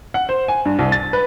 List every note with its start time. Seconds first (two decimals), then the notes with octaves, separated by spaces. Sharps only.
0.14 F#5
0.29 C5
0.48 G#5
0.65 G2
0.79 C2
0.92 A6
1.13 B4